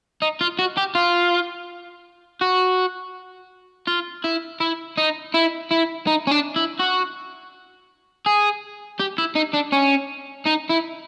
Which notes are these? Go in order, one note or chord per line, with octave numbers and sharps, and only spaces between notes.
D#4
F4
F#4
G4
F4
F#4
F4
E4
E4
D#4
E4
E4
D#4
C#4
D4
E4
F#4
G#4
G4
E4
D#4
D4
C#4
D#4
E4